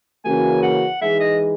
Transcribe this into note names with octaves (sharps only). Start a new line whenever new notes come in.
C#3 E3 A#3 C#4 F#4 G#5
F#5
E3 G#3 D#4 G#4 E5
D#5